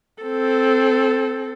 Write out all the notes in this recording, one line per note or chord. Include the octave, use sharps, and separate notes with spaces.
C4 A4